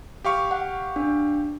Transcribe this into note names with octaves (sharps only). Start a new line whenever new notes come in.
G4 F5 C#6
F#5
D4